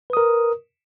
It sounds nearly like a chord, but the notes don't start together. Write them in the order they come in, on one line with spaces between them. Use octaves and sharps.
B4 D#6 A#4